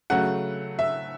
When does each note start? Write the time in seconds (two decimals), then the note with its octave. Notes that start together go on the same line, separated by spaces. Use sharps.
0.10 C#3 F#3 A3 F#5
0.79 E5